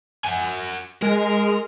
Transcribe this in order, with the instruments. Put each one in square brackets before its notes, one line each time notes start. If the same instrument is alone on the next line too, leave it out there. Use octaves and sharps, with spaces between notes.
[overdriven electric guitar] F#4 G#5
[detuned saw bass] G#3 [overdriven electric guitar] A#4